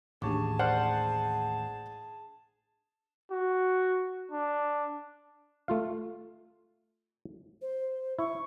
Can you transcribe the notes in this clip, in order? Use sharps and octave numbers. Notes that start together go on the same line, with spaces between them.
A1 D#2 D4 G4 G#4 C#5 A5 D6
C5 D5 F#5 F6 F#6
F#4
D4
A3 F4 F5
C5
E4 C#6